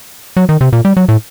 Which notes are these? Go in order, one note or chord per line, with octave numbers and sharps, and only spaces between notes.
F#3
D#3
C3
A#2
G3
F#3
A2